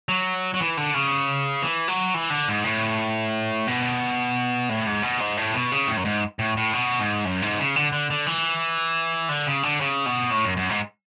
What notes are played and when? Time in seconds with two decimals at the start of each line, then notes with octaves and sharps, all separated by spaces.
0.09 F#3
0.54 F#3
0.61 E3
0.77 D3
0.94 C#3
1.62 E3
1.88 F#3
2.14 E3
2.30 D3
2.48 G#2
2.64 A2
3.67 B2
4.69 A2
4.86 G#2
5.03 B2
5.20 G#2
5.37 A2
5.54 B2
5.72 C#3
5.88 A2
5.97 F#2
6.05 G#2
6.39 A2
6.57 A2
6.73 B2
6.99 G#2
7.25 F#2
7.42 G#2
7.59 C#3
7.76 D3
7.93 D3
8.10 D3
8.27 E3
9.29 D3
9.47 C#3
9.63 D3
9.81 C#3
10.06 B2
10.31 A2
10.45 F#2
10.57 F#2
10.70 G#2